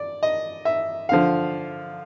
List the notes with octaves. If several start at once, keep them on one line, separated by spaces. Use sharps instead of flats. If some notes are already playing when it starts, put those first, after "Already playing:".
Already playing: D5
D#5
E5
D3 F3 F5